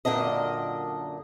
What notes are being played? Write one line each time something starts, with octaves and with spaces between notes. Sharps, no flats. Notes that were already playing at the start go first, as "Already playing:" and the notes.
F#2 A#2 D3 D4 D#5